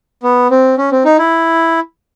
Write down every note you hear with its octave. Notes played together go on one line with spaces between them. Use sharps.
B3
C4
C#4
C4
D#4
E4